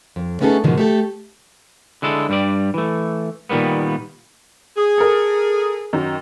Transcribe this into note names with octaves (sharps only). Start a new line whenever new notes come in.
F2
A3 B3 C#4 D#4 G#4 A4
G#2 B2 D3 D#3 F3
A3 G4 A4
D3 G#3 E4 A4
G2 G3 D5
E3 A3
A#2 D#3 G3 A#3 B3
G#4
A4 A#4
F#2 D#3 D#4